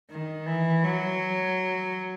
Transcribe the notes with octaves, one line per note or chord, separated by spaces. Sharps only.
D#3
E3
F#3